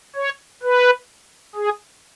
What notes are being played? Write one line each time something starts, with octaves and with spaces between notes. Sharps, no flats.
C#5
B4
G#4